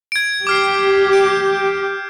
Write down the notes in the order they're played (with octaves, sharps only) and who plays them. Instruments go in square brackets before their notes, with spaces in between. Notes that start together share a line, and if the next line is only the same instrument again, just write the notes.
[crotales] G#6 D7
[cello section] G4 [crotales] D6 F6 C7
[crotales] G6 D7